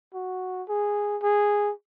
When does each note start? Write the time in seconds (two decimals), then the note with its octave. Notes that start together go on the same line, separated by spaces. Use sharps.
0.14 F#4
0.69 G#4
1.23 G#4